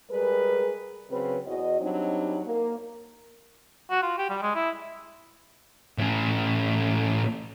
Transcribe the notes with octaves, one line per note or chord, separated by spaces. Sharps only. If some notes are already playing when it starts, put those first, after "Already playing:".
G3 G#3 G#4 A#4 B4
C#3 F#3 C4 B4
E2 E3 F#4 D#5
F#3 G3 C4 D4 D#4
A#3
F#4
F4
G4
G3
G#3
E4
A2 C#4